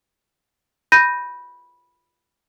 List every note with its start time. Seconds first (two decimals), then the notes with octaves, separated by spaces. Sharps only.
0.92 B5 G6 A#6 D#7